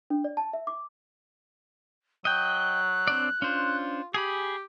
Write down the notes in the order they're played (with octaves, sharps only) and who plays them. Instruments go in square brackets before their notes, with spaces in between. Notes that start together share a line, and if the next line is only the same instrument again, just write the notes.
[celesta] D4
D5
A5
E5
D6
[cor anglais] F#3 [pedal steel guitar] D#5 G5 [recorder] F#6
[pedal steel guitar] C4 D4 D5
[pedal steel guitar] C#4 D4 C5 [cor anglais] F4
[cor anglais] G4 [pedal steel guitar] G#4 G#5 B5